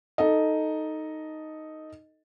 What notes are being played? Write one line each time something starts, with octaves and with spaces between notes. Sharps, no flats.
D#4 A4 D#5